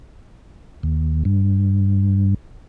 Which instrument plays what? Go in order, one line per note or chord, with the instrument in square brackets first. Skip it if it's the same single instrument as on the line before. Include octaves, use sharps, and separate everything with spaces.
[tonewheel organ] D#2
G2